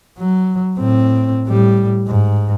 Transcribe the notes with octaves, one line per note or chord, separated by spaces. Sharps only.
F#3
A2 C4
A2 G3
G#2